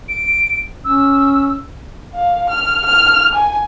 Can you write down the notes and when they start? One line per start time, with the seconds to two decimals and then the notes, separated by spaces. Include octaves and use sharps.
0.08 D7
0.85 C#4 E6
2.15 F5
2.50 F6
2.86 F6
3.35 G#5